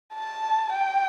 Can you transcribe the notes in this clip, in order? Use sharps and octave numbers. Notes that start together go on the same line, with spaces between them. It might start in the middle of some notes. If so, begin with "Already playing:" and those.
A5
G5